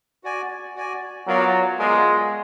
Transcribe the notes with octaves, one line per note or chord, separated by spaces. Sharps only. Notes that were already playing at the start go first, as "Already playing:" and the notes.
F#4 D5 G#5
F#4 D5 G#5
F#3 B3 F4 A#4 D5 F5
G#3 B3 F4 A#4 D5 F5